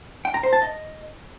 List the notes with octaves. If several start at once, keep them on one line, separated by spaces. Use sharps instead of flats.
G5
A#5
C5
A5
D#5